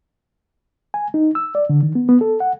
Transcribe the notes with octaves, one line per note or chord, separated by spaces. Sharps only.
G#5
D#4
E6
D5
D3
D#3
B3
B3
A4
F#5